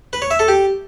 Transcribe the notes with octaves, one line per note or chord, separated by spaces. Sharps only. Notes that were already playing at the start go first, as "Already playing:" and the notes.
B4
C#5
E5
A4
G4